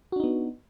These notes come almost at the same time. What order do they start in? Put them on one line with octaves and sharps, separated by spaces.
F#4 D4 D#4 B3